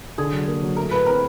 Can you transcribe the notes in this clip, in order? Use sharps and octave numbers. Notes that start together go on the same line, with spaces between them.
D3 G#4
F#3
A#3
F#3
A3 A#4
A2 B4
C4 A#4